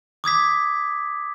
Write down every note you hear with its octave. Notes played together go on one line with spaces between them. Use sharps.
D6 D#6 G#6 B6